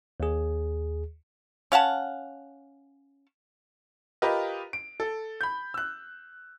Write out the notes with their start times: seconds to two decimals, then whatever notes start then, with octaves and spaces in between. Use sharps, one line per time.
0.20 D#2 G#4
1.72 C#4 F5 F#5 A5
4.22 F4 G4 A#4 B4 D#5
4.73 D7
5.00 A4
5.41 B5 G6
5.74 E6 F#6